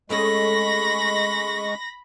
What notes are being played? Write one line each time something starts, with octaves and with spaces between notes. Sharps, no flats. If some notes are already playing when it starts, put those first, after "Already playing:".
G#3 A3 C#4 G#4 B5 C#6 A#6